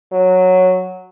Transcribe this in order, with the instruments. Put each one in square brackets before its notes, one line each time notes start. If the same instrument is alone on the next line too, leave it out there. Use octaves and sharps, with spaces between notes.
[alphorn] F#3